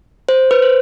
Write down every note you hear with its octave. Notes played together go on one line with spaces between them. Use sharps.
C5
B4
C5